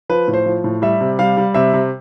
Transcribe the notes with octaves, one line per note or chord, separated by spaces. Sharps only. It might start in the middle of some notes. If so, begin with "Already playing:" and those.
F3 B4
A2
C5
F3
A2
G3 E5
C3
G3 F5
G3
C3 E5
C3